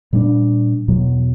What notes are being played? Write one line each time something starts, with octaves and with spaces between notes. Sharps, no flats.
A#2 G3 B3 D4
E2 B2 F#3